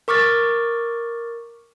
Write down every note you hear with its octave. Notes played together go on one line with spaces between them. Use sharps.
A#4 C#6 D6 F6 A6